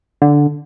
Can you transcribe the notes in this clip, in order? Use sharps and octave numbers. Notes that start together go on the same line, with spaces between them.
D3